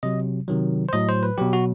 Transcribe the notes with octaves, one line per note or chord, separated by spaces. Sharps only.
C3 F#3 D#5
C3 D#3 F#3
C5
A2 F#3 D#5
C5
B4
B2 F#3 G4
F#4